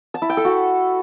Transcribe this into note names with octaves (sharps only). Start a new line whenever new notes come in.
A5
E4
G5
A4
F#4